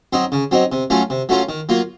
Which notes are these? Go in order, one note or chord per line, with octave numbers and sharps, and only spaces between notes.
F#3 C4 D#4
C#3
F#3 C4 D#4
C3
F#3 A3 C#4 F4
C3
F#3 A3 C#4 F4
D#3
F#3 A#3 F4